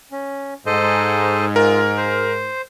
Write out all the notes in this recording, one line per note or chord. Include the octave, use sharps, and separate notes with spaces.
C#4
G#2 A4 C5 D#5
F4 A#4
C5